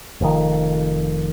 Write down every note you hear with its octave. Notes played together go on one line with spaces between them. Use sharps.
F1 F2 D#3